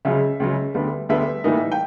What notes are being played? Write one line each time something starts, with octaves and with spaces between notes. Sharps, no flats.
C#2 C#3 F#3 E5
C#2 C#3 F#3
D2 D3 G3 B3
D2 D3 G3 B3 E5
A2 E3 G3 A#3 D#4
G5